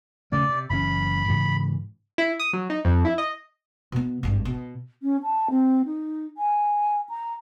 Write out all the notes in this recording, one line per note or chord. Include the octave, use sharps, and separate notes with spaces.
C#3 A3 C#4 D5
C3
F#1 E3 C#4 B5
G#2 C#3 E3
E4
D#6
F#3
D#4
F2
E4
D#5
B2 B3
G#1 G2
B2
C#4
A5
C4
D#4
G#5
A#5